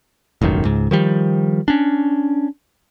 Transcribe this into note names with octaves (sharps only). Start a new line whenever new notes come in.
E1 A1 F#2 D#3
C#2 G#2
D#3 F3 G3
C#4 D4